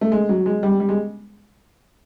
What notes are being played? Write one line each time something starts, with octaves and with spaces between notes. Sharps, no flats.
A3
G#3
F#3
G#3
G3
G3
G#3